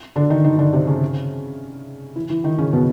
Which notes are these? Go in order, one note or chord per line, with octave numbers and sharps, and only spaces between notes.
D3 D4
D#3 D#4
D#3 D#4
D3 D4
C3 C4
C#3 C#4
E3 E4
E3 E4
D#3 D#4
C#3 C#4
B2 B3